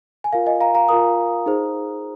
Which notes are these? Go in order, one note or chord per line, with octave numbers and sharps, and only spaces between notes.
G#5
F4 A#4 F5
D#5 G#5
F5 A#5
F5 A#5
F4 A#4 A#5 D#6
D#4 G#4 C5